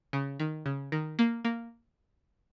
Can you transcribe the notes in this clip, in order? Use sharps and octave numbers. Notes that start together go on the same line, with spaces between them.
C#3
D#3
C#3
D#3
A#3
A#3